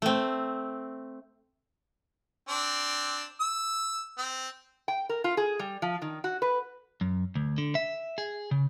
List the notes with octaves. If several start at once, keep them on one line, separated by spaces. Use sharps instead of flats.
A3 C4
C4 D4
E6
C4
G5
A#4
F4
G#4
G3
F3
D#3
F#4
B4
F#2
D2
D3
E5
G#4
C#3